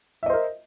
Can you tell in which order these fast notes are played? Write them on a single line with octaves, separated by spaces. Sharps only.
E5 D#5 C5 A#4